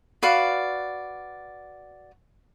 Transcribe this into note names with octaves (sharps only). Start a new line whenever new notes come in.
F#4 B4 D5 F5